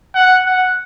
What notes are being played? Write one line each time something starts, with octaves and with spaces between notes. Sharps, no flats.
F#5
F#5